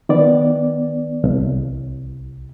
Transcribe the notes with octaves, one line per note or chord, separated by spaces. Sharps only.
D#3 B3 D5
C2